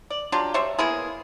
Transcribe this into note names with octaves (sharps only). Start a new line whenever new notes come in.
D5
F#3 D4 F4 G4
G3 C5 C#5 E5
A#3 B3 E4 G#4